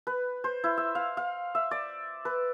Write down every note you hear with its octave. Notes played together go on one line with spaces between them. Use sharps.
B4
C5
E4
E5
F5
F5
E5
D5
B4